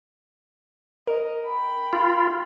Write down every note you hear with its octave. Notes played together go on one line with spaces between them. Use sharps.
A#4 D#5
G5 B5
F4